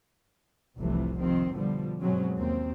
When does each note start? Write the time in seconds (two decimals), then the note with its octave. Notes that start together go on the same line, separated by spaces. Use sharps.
0.78 F1 C2 A2 C3 E3 A3
1.18 C3 D#3 F3 C4
1.52 B2 D3 F3 G3
2.00 G2 B2 F#3 G#3 C4 C#4
2.36 D#2 A#3 C4